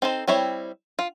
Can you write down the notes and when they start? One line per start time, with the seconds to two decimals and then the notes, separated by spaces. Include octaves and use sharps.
0.02 C4 D#4 A4 C5
0.28 G3 C4 E4 C#5 E5
0.99 F4